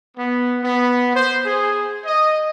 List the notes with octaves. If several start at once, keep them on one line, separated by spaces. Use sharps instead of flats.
B3
B3
C5
G#4
D#5